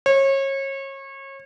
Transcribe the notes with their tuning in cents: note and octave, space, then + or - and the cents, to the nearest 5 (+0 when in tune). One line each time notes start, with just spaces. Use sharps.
C#5 -30